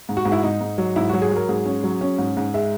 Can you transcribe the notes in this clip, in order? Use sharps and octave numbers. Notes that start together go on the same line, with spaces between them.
G#2
F#4
G#2
E4
G#2 D#4
G#2
F#3
G#2 E4
F#3 F#4
G#4
F#3 A#4
G#2 G#4
C#4
F#3
C#4
G#2
G#2
G#3 E5